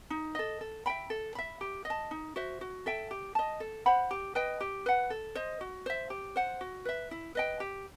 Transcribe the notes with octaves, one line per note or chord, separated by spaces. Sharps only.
D#4
A4 D#5
A4
E5 G5 B5
A4
E5 B5
G4
D#5
A5
D#4
F#4 C5 E5
F#4
A4 E5 G5
G4
D#5 A5
A4
C5 F#5 B5
G4
B4 D#5 G5
G4
B4 F#5
A4
C5 D#5
F#4
C5 E5
G4
C5 F#5
F#4
B4 E5
E4
B4 D#5 G5
G4